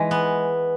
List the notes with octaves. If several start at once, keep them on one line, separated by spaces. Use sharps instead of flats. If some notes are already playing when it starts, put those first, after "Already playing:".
Already playing: E3 G#3
B3